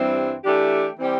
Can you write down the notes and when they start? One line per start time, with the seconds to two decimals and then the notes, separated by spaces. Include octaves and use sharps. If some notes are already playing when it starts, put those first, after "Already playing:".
Already playing: G2 E3 G3 C4
0.45 E3 A3 D4 G4
0.98 E3 G3 C4 G4